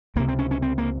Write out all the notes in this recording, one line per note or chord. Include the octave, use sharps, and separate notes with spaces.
C#2 C3 A#3
C4
C#4
C#4
C4
A#3